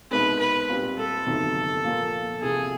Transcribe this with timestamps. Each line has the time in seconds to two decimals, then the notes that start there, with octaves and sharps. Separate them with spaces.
0.11 C2 B2 G#3 C4 D#4 B4
0.39 B4
0.69 A#2 G3 C4 F4
0.98 A4
1.26 G1 F2 C3 D#3 F#3
1.84 A#2 F3 A#3
2.42 C2 C3 F3 G#4